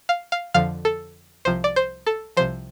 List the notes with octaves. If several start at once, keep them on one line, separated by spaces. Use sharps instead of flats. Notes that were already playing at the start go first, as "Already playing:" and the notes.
F5
F5
F2 D3 F3 F5
A4
C2 C3 F3 C5
D5
C5
A4
C2 C3 F3 C5